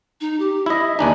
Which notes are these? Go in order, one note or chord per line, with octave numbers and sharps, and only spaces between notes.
D#4
G4
E4 D#5 E5
D#2 D4 D#4 G#5